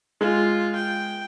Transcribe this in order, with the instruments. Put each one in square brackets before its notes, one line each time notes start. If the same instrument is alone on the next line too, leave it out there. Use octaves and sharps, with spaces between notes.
[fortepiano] G#3 [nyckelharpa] F4
[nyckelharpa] G5